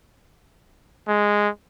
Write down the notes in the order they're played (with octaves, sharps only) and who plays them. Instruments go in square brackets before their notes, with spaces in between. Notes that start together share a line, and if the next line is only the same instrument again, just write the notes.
[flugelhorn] G#3